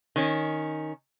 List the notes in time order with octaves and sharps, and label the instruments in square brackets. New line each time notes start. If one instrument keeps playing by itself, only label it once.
[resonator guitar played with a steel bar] D#3 C#4